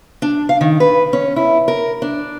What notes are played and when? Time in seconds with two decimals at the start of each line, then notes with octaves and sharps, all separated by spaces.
0.22 D4
0.49 F5
0.61 D#3
0.80 B4
1.13 C#4
1.36 E4
1.68 A#4
2.02 D4